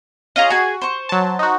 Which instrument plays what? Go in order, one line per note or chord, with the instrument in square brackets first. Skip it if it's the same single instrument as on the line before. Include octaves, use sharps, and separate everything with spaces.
[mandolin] C#4 F4 G#4 [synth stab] D#5 A#5
[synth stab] F#4 [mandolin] G#4 G#5
[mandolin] C5 C#6
[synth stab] F#3 A5
D#4 F#4